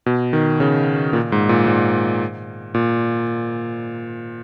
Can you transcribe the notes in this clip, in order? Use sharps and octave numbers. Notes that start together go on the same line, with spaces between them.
B2
D#3
C#3
A#2
G#2
A#2
G#2
A#2